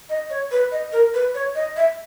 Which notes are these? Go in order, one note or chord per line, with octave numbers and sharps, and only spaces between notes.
D#5
C#5
B4
D#5
A#4
B4
C#5
D#5
E5